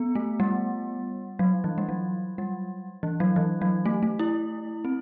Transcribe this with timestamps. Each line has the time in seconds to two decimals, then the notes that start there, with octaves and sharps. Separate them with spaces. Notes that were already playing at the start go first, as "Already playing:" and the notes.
Already playing: B3
0.15 A3
0.40 G3
1.39 F#3
1.64 E3
1.78 G3
1.89 F#3
2.38 G3
3.03 E3
3.20 F#3
3.36 E3
3.62 F#3
3.86 A3
4.03 A3
4.19 E4
4.85 C4